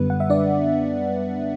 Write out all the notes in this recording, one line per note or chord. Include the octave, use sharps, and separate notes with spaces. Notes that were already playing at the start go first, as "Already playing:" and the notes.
Already playing: F#2 D3 G3 B3 B4
F#5
E5
D4 D5